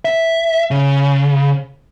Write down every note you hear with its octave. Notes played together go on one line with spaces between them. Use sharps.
E5
C#3